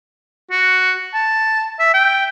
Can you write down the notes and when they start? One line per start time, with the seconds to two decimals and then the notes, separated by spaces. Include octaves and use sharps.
0.51 F#4
1.14 A5
1.79 E5
1.94 G5